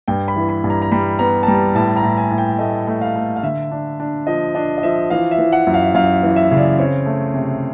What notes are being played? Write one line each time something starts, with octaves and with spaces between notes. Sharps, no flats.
G2 G5
B5
E3
B5
G2
A#5
A#5
G3 B5
B3 A#5
A5
G3 A#5
A2 A5
A#5
A2
G#5
A2
G5
A3 D#5
A3
F5
A3
F5
D3 E5
D4
D4
F3 D#5
D4 D#5
D#5
F3 E5
E3 F5
E5
E3
F#5
F#2
F5
F#2 F5
E3
E5
C#3
D5
C4 C#5
A3
C3